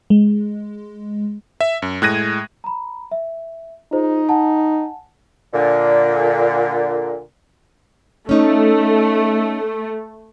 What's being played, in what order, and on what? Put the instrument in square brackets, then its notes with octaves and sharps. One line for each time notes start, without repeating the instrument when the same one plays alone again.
[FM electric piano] G#3
[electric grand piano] E5
F#2
A2 G#3 F#6 G#6 A#6 D#7
[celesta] A#5 B5
E5
[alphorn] D#4 [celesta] F4 G#4 C5
[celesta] F#5 G#5 A5
[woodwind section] A#2 D3
[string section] A3 [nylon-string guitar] C#4 D#4